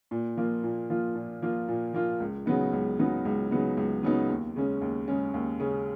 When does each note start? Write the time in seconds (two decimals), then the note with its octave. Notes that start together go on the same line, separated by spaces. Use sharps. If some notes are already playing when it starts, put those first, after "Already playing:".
0.11 A#2
0.37 F3 A#3 F4
0.64 A#2
0.90 F3 A#3 F4
1.15 A#2
1.42 F3 A#3 F4
1.68 A#2
1.94 F3 A#3 F4
2.20 C#2
2.46 C#3 F#3 B3 D#4
2.72 C#2
2.99 C#3 F#3 B3 D#4
3.25 C#2
3.51 C#3 F#3 B3 D#4
3.77 C#2
4.03 C#3 F#3 B3 D#4
4.29 D#2
4.56 C#3 G#3 C#4
4.81 D#2
5.08 C#3 G#3 C#4
5.34 D#2
5.60 C#3 G#3 C#4